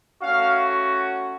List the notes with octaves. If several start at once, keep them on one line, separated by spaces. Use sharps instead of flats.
A3 C#4 F#4 F5